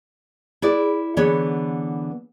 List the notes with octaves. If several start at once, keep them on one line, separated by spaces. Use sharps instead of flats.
E4 G#4 B4 D5
D3 E3 B3 G#4 C#5